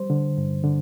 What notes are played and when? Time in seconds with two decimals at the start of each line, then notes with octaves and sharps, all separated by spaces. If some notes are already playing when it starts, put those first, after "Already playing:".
Already playing: G3 C5
0.10 D3
0.37 G2
0.64 D3